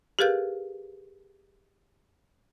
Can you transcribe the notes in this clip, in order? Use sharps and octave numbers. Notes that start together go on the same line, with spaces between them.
G4 G#4 A#4 B4 F5 G6